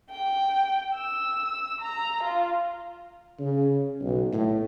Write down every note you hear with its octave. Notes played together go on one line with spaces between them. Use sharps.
G5
E6
A#5
F4
C#3
B1
A2